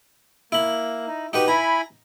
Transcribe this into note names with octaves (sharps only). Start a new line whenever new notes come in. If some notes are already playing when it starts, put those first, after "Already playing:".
A#3 E4 B5
D#4
D#4 F#4 G4 B4
E4 G#5 A#5 B5